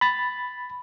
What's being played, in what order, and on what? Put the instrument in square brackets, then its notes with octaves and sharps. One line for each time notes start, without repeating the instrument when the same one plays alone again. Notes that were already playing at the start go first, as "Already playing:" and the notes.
[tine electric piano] B5 A6